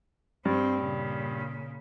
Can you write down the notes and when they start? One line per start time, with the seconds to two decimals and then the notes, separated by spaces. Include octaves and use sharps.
0.45 G2 C4
0.80 A#2 C#3